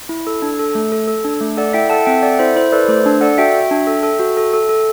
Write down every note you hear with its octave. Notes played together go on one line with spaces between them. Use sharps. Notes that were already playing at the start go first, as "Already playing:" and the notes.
E4
A4
D4
A4
A3
A4
A4
D4
A3
A4 D5 F#5
E4 E5 G5
A4 F#5 A5
C4 E5 G5
A4 D5 F#5
E4 C5 E5
E4 C5
A4 B4 D5
A3 C5
D4
A4 D5 F#5
F#4 E5 G5
F#4
D4
A4
A4
F#4
A4
A4
A4